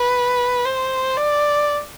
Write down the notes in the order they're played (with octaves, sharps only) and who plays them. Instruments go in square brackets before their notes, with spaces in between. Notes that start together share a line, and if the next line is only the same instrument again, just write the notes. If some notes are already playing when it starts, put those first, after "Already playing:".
Already playing: [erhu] B4
C5
D5